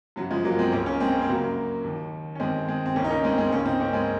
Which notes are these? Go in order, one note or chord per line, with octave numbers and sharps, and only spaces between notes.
F#2 C#3 F#3
F3 G#3
F#3 A#3
G#3 C4
C#2 C#3 A#3 C#4
A#3 C#4
G#3 C4
A#3
C4
F#2 C#3 F#3 A#3
D#2 D#3
C#4
D#2 D#3 G#3 C4
G#3 C4
C4
C#2 C#3 A#3 C#4
D#4
A#3 C#4
G#3 C4
G#3 C4
C#2 C#3 A#3 C#4
C4 D#4
A#3 C#4
G#3 C4